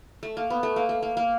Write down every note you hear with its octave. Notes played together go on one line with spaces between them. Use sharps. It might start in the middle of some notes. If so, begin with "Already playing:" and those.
A3
A#3
B3
A3
A#3
A3
A#3
A#3